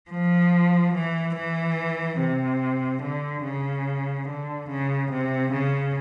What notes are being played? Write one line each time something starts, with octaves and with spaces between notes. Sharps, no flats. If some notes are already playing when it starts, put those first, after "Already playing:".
F3
E3
E3
C3
D3
C#3
D3
C#3
C3
C#3